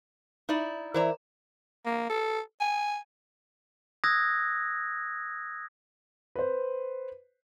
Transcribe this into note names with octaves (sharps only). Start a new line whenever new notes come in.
D#4 E4 D5
E3 E4 A#4 C5 D5 A#5
A#3
A4
G#5
D#6 E6 F#6 G#6 A#6
B4 C5